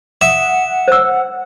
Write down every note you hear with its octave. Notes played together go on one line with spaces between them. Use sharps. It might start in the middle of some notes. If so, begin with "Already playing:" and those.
E5 F#5 D#6
C5 E6